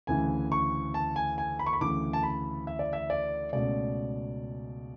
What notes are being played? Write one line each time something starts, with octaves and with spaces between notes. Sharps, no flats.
D2 C#3 E3 G#5
C#6
A5
G#5
G#5
B5
C#6
B5
D2 C#3 E3 D6
A5
B5
E5
D5
E5
D5
C#2 B2 A3 C#4 D5